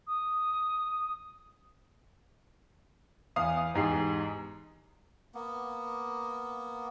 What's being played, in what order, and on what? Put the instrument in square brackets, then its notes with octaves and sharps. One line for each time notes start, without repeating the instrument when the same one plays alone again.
[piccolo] D#6
[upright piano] E2 F5 D#6
E2 G#2 G4 C7
[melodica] A#3 B3